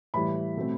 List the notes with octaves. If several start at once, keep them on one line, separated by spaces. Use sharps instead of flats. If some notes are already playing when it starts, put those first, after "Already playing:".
A2 E3 G3 B5
B2 A3 C4